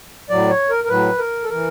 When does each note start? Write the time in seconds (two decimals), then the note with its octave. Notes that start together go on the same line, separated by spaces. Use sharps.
0.30 A2 F#3 D5
0.50 C#5
0.70 A#4
0.84 A#4
0.89 A2 F#3 B4
1.19 A#4
1.44 A4
1.49 E3 A#4